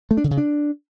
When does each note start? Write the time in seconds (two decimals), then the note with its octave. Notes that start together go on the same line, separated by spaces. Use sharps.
0.11 A3
0.17 D4
0.24 D3
0.31 C#3
0.37 D4